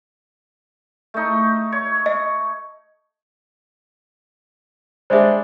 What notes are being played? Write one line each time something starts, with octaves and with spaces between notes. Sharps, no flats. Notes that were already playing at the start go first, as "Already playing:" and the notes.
A3 D#4
C#5
D#5
G3 G#3 D4 C5 E5